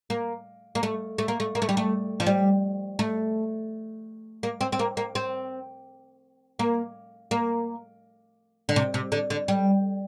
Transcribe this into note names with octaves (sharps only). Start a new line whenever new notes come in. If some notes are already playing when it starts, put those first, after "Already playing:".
A#3
A#3
A3
A3
A#3
A3
A#3
A3
G3
A3
F3
G3
A3
A#3
C4
C4
A#3
A#3
C4
A#3
A#3
D3
C3
C3
D3
D3
G3